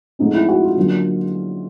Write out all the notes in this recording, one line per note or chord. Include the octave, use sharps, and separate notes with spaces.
G#2 F3 A3 C4 D#4
E4
F#4
F4
D3 F#3 A#3 C#4 F4